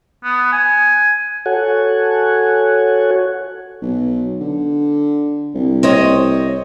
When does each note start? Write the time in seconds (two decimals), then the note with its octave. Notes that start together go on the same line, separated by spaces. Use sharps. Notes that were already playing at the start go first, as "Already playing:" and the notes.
0.24 B3
0.52 G#5
1.46 F#4 A4 C#5 F#5 G#5
3.82 B1
4.41 D3
5.54 C2
5.83 C4 C#5 D#5